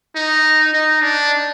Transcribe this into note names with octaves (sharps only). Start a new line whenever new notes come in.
D#4
D#4
D4